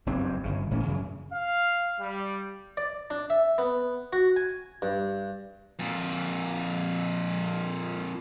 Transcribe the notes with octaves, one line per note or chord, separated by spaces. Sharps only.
F#1 E2 G2 C4
G1 C#3
E1 A2 E3 C#4
F#2 C#3
F5
G3
D5
D4
E5
B3
F#4
G#5
G2
F2 A#2